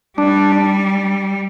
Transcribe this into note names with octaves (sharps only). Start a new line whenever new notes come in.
G3 D4